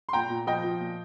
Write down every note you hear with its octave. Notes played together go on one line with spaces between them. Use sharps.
C6
A#2 G5 A#5
A#2
F3 D#5 G5
F3
A#2